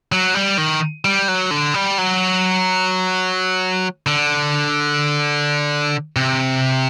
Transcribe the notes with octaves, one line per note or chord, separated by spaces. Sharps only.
F#3
G3
D#3
G3
F#3
D3
G3
F#3
D3
C3